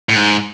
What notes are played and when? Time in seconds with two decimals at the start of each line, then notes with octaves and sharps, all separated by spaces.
0.09 A2
0.16 G#2